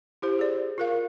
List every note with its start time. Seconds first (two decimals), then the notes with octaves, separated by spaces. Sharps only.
0.22 E4 G4 C5
0.39 G#4 D5
0.78 F4 A#4 F5